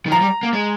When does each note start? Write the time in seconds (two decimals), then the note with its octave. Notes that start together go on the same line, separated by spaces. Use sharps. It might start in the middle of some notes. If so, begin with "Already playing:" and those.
0.06 D#3
0.11 F3 A#5
0.21 G3
0.43 A#3
0.53 G#3